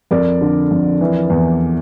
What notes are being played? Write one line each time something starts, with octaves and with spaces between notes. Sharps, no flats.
F2 A#4 D5
D3
F2
E3
E2